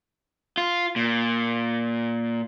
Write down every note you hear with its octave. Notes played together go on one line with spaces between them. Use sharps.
F4
A#2